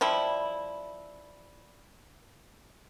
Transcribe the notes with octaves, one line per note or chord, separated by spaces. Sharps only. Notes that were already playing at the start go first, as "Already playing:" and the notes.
F3 G3 E4